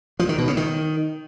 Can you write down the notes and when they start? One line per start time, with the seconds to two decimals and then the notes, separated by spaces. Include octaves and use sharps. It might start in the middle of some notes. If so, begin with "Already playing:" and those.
0.19 F3
0.29 D#3
0.38 B2
0.48 C#3
0.57 D#3